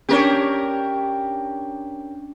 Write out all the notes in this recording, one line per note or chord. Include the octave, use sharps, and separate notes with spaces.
C#4 D4 G4 A#4 C#5